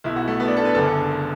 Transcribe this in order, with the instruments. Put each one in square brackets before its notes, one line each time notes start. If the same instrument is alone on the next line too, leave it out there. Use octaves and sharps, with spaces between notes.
[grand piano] B1 B2 E4
F#4
A3
B3
D4
A4
B4
F#1 F#2 D3 A4